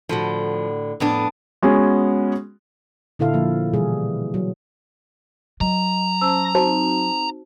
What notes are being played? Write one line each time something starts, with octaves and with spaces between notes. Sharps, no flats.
A2 D3 F3 F#4
F2 A2 B3 D4
G#3 B3 C#4 F#4 G#4
A#2 D3 E4 A4 F5
D3 F3 A#3
B2 E3 G3 G#4
F#3
F#3 D#5 A#5
C#4 C5 A5 E6
C4 D#4 F#4 C5 A5